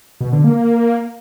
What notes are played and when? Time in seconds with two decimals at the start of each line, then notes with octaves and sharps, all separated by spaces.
0.21 B2
0.32 D3
0.44 A#3